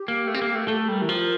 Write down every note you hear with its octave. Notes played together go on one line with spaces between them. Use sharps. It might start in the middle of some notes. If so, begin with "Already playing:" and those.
Already playing: G4
A#3
A3
C4
A#3
A3
A3 A4
G3 A#4
E3
F3